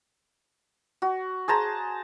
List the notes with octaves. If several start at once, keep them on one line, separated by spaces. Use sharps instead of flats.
F#4
G#4 C5 A5 A#5